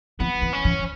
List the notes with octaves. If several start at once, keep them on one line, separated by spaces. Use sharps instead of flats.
E3 B3
E3
C#4
E3